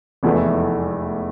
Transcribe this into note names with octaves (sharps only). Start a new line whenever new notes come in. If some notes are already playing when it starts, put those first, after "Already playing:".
F1 E2 E3 A3 E4